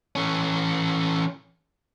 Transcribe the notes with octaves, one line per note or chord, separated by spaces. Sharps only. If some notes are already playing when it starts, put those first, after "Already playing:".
E3 C#4